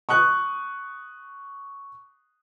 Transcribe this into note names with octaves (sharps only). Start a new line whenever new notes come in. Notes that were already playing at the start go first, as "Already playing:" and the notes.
C#6 D#6 F#6